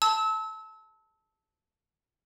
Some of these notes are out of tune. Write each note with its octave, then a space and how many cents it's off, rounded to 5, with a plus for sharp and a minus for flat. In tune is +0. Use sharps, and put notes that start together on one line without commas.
A5 +0 E6 -30